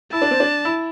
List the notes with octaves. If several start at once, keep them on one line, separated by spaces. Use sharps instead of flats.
E4 A5
D4
C4
D4
E4